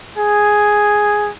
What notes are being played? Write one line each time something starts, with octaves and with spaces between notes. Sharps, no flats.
G#4